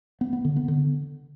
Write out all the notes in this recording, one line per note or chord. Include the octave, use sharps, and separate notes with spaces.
B3
B3
D3
B3
D3